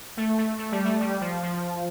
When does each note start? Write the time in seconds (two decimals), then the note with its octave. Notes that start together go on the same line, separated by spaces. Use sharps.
0.17 A3
0.38 A3
0.59 A3
0.72 G3
0.85 A3
1.01 G3
1.21 F3
1.43 F3